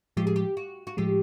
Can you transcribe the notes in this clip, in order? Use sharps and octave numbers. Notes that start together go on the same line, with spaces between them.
A2 F3 G#3 G4
G#4
G4
F#4
F#4
A2 F3 G#3 G4